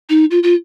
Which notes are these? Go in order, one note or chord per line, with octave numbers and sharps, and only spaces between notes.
D#4
F4
F4